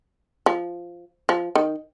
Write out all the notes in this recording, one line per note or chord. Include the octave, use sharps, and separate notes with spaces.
F3
F3
D#3